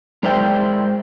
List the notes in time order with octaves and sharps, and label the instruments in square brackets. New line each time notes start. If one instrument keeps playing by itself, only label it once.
[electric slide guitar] G#3 A#4 C5 D5 E5 G5